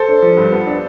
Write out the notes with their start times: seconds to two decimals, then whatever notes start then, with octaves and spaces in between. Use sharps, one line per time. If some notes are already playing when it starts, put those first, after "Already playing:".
Already playing: A4 C5
0.08 D4
0.22 F3
0.37 G2
0.52 B3
0.67 D4